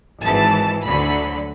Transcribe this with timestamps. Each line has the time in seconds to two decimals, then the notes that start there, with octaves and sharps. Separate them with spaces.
0.22 G#1 G#2 E3 A5
0.84 D2 D3 F#3 B5